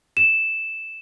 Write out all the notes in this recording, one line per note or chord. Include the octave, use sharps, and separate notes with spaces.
E7